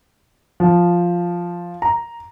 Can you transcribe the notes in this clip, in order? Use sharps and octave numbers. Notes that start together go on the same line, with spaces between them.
F3
A#5